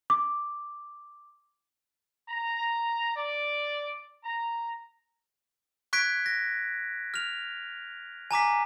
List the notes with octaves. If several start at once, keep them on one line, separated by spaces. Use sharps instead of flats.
D6
A#5
D5
A#5
C#6 F#6 G#6 B6 D7
A#6
F6 F7
G#5 A#5 D6 B6